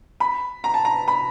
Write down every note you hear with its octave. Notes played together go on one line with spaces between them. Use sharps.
B5
A#5
A5
A#5
B5